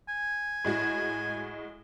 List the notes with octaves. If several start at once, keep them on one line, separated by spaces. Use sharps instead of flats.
G#5
A2 G#3 F#4